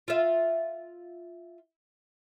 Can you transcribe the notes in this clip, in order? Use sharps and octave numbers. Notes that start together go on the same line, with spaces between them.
F4 E5